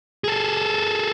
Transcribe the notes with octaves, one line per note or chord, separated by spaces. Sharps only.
G#4 A4